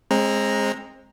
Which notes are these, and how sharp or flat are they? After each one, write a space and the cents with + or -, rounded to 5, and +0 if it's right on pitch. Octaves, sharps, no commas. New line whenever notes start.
G#3 +0 C4 +30 A#5 +0